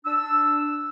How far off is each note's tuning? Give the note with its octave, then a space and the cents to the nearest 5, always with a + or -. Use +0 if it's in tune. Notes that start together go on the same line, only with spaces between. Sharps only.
D4 +0 E6 +0